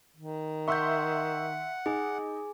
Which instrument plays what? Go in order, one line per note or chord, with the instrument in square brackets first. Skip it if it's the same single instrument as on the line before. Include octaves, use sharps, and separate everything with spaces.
[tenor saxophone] D#3
[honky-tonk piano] E5 C6 [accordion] F#5 [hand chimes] C#6 E6 G6
[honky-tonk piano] D#4 [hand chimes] G#4 G#5